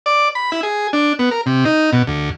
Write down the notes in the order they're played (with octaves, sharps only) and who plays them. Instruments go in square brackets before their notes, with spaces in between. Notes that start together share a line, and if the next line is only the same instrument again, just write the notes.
[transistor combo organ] D5
B5
E4
G#4
D4
B3
A#4
C3
D#4
B2
D2